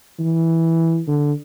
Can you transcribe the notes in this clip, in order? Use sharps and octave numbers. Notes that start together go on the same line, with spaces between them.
E3
D3